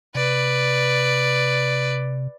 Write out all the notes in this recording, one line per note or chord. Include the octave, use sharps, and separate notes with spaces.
C3 B4 D5